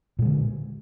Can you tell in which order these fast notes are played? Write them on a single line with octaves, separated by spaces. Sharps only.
A#2 G#3 D3